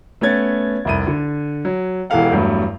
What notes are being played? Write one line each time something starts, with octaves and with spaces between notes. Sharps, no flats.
A3 B3 C#4 G#6 A6
F1 C2 D#7
D3
F#3
E1 E3 G4 A4 F5 F#5
E2 G2 F#3 A3